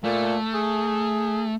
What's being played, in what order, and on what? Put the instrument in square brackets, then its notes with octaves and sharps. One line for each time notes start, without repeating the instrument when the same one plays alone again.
[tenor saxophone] A#2 [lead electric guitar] A3
[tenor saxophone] G#4